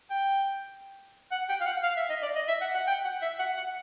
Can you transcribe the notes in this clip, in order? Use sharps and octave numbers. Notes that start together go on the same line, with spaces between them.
G5
F#5
G5
F5
F#5
F5
E5
D#5
D5
D#5
E5
F#5
F#5
G5
F#5
E5
F#5
F#5